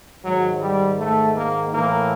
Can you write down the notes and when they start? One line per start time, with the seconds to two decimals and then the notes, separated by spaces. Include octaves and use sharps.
0.22 G#2 D#3 F#3
0.59 G3
0.98 A3
1.35 A#3
1.73 A2 E3 A#3